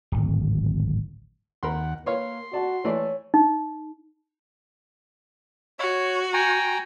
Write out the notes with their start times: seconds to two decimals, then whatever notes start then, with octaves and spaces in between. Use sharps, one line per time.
0.12 D1 G#1
1.63 D#2 A#4 F#5 B5 C6
2.06 A#3 B4 C#5 F5 C6
2.53 F#4 D5 A5
2.85 E3 A3 C#5 D5
3.34 D#4
5.79 F#4 C#5
6.33 G5 G#5 A#5